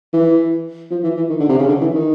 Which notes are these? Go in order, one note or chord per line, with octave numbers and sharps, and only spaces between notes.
E3
F3
E3
E3
D#3
D3
C3
C#3
D3
E3
D#3